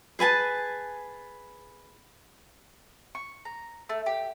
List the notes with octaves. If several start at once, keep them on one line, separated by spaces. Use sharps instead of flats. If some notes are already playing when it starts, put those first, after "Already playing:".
G#4 B4 G#5 A5
C#6
A#5
A3
G4